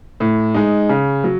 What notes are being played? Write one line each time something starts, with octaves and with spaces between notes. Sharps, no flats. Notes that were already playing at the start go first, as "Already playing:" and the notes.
A2
G#3 D#4
C#3
F#3